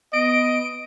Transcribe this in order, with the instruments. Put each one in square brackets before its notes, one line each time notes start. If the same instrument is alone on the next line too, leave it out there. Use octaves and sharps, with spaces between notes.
[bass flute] B3 [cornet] D#5 [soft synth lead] D7